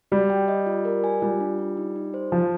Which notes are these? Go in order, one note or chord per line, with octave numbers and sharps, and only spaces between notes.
G3 F#4
G5
D#5
F4
A#4
G#5
G3 F4
D4
F4
D#4
D#4
C5
F3 F4